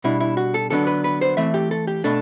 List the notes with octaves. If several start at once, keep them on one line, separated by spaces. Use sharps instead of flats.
B2 G3 D4 E4
E4
F#4
A4
D3 F#3 B3 D4 A4
B4
B4
C5
E3 A3 C4 E5
G4
A4
G4
B2 A3 D4 A4